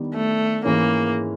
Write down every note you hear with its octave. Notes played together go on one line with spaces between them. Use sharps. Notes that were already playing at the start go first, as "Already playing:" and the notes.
Already playing: D#3 G3 B3 D4
A3
G#2 E3 G#3 A#3 C#4